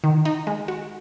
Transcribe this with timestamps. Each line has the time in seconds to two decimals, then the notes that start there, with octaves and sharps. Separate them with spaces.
0.04 D#3
0.25 D#4
0.47 G#3
0.68 F#4